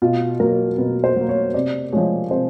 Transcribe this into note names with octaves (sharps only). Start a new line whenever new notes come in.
B2 F4
F#3 A#3 A#4
B2 B4
C5
F#3 A#3
C#5
C3 D5
F3 G#3 C#5
C3 C5